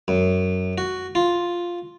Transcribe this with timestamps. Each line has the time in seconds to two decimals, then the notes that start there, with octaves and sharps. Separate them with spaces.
0.08 F#2
0.78 F#4
1.15 F4